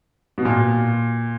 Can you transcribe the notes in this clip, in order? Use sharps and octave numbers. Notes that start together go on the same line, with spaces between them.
B2
A#2